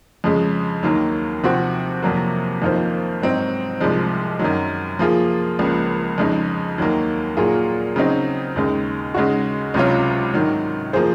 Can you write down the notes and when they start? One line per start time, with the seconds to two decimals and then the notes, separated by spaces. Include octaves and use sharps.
0.24 F2 C#3 G#3
0.83 D#2 D#3 F#3 A#3
1.43 C3 F3 C4 F#4
2.03 F2 C3 F#3 A#3
2.62 F2 D#3 A#3 F4 C5
3.21 G#2 F#3 C4 D#4
3.80 C2 C3 F3 G#3
4.39 F#2 D#3 F#3
4.99 F3 A#3 F4 G#4
5.59 C#2 C#3 F3 A#3
6.18 F2 C#3 G#3 D#4
6.78 D#2 D#3 F#3 A#3
7.37 A#2 F#3 A#3 F4 G#4
7.96 C#3 F#3 C4 D#4
8.56 D#2 C#3 G#3 D#4
9.14 C#3 G#3 D#4 F#4
9.74 C#2 C3 F#3 C#4 F4
10.34 G#2 D#3 F#3
10.93 F3 A#3 F4 G#4 C5